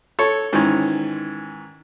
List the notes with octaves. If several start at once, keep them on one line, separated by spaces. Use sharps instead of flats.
A4 C#5
G#2 D#3 E3 C#4